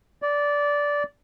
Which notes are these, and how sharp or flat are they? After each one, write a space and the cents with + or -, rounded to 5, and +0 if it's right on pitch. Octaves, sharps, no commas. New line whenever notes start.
D5 -15